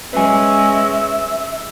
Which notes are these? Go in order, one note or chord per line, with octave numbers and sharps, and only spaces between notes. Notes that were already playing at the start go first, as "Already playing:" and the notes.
G#3 C#4 B4 E5 G#5